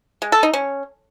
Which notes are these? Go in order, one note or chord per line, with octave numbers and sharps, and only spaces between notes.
G#3
A4
D#4
C#4